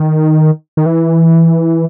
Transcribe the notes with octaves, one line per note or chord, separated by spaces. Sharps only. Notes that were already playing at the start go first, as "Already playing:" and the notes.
Already playing: D#3
D#3
E3